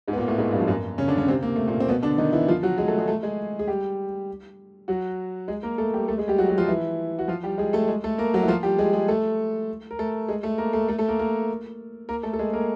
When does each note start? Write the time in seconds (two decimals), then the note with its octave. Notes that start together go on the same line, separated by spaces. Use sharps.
0.08 G#2 G#3
0.13 B3
0.17 A#2 A#3
0.28 A2 A3
0.38 G#2 G#3
0.52 G2 G3
0.60 F3
0.67 F#2 F#3
0.98 C#3 C#4
1.08 D3 D4
1.18 C#3 C#4
1.28 C3 C4
1.43 A#3
1.56 A3
1.68 A#2 A#3
1.80 C4
1.88 B2 B3
2.02 D3 D4
2.18 D#3 D#4
2.33 E3 E4
2.48 F3 F4
2.63 F#3 F#4
2.78 G#3 G#4
2.88 A3 A4
2.98 G#3 G#4
3.08 A3 A4
3.23 G#3 G#4
3.59 G#4
3.68 G3 G4
4.88 F#3 F#4
5.48 G#3 G#4
5.63 A#3 A#4
5.78 A3 A4
5.94 G3 G4
6.08 A3 A4
6.18 G#3 G#4
6.28 G3 G4
6.38 F#3 F#4
6.48 F#3 F#4
6.58 F3 F4
6.68 E3 E4
7.19 F#4
7.28 F3 F4
7.43 G3 G4
7.58 G#3 G#4
7.73 A3 A4
7.88 G#3 G#4
8.04 A3 A4
8.18 A#3 A#4
8.34 F#3 F#4
8.43 E4
8.48 F3 F4
8.63 G3 G4
8.78 G#3 G#4
8.93 G#3 G#4
9.08 A3 A4
9.91 A#4
9.99 A3 A4
10.28 G#3 G#4
10.43 A3 A4
10.58 A#3 A#4
10.73 A3 A4
10.88 A3 A4
10.99 A3 A4
11.08 A#3 A#4
11.19 A#3 A#4
12.09 A#3 A#4
12.23 A3 A4
12.33 A4
12.39 G#3 G#4
12.53 A#3 A#4